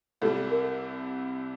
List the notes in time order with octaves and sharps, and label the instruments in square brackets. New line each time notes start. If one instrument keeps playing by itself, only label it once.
[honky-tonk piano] C2 C3 G3 [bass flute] A4
[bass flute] A#4